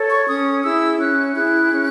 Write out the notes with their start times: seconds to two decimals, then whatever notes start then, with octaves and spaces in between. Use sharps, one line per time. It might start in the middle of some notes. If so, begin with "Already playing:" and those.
Already playing: A4 C#5
0.10 C#6
0.28 C#4 D#6
0.63 E4 G#4 E6
0.99 C#4 F#6
1.35 E4 G#4 F#6
1.71 C#4